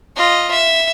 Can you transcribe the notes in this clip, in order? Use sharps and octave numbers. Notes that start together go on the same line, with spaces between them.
F4 D#5
E5